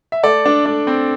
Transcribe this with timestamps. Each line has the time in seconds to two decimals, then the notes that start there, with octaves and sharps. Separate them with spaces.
0.12 E5
0.23 A3 A4 D5
0.46 D4
0.66 A3 D4
0.87 C4